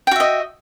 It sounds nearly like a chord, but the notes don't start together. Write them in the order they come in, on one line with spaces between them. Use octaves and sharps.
G5 F#4 E5 D#5